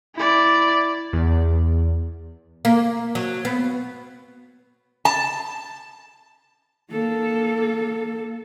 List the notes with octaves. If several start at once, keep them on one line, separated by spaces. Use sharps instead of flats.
E4 D5
E2
A#3
F#3
B3
A5
A#3 A4